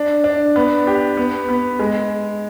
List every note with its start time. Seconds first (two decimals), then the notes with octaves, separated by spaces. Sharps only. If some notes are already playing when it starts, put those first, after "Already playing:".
Already playing: D4
0.24 D4
0.56 B3
0.87 G4
1.17 B3
1.49 B3
1.79 G#3